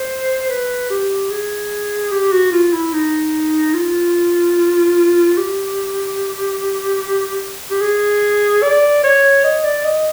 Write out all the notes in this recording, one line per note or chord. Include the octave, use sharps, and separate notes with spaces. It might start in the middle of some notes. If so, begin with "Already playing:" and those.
Already playing: C5
B4
G4
G#4
G4
F#4
F4
E4
D#4
F4
G4
G4
G#4
D5
C#5
D#5
D5
D#5